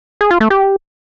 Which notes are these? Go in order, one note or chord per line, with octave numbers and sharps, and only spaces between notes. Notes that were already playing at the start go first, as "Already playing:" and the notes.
G#4
F4
A3
G4